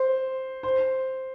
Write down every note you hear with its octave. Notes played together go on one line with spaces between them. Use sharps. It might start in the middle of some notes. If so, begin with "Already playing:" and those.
Already playing: C5
C5